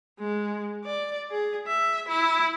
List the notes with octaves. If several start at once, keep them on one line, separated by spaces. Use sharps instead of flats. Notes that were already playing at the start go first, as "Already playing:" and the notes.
G#3
D5
G#4
E5
E4